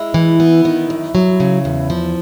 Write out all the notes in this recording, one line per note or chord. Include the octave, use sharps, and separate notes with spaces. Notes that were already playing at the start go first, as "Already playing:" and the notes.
Already playing: G#3 E4
E3
B3
D#3
F#2
F#3
C#3
E2
F3